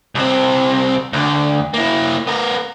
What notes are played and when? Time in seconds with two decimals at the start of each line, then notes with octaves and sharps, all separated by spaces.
0.15 C2 C4
1.13 D2 D3
1.74 A#3 E4
2.27 B3 A#4